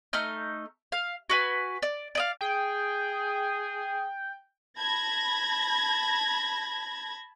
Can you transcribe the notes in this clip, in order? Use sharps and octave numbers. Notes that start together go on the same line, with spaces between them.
A3 D#4 F6 G6
F5
F#4 B4 G#5
D5
D5 D#5 F5
G#4 G5
A5 B5 G#6 A#6